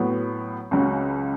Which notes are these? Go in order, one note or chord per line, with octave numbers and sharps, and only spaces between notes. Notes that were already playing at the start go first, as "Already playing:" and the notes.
Already playing: A2 F#3 B3
C#2 C#3 F#3 C#4